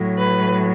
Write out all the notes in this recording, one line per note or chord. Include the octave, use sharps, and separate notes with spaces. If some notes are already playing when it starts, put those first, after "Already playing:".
Already playing: A2 F#3
B4